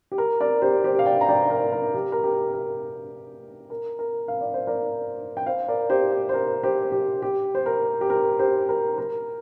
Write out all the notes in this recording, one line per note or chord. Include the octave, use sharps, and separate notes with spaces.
G4
A#4
A#4 D5
G4 C5
G4 C5
F5
D5 G5
A#5
D5 G5
A#4
A#4
G4
A#4
G4
A#4
A#4
A#4
F5
D5
C5
A#4 D5
G5
C5 F5
A#4 D5
G4 C5
G4
C5
A#4
G4 C5
G4
G4
C5
A#4
G4
A#4
G4 C5
A#4
A#4